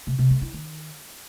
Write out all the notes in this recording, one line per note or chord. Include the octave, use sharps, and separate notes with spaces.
C3
C3
A3
E4
D#3